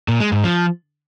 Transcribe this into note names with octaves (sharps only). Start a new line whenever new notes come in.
A#2
G#3
G#2
F3